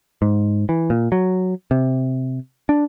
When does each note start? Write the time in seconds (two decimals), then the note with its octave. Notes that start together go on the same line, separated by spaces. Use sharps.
0.22 G#2
0.69 E3
0.90 A#2
1.12 F#3
1.71 C3
2.69 D4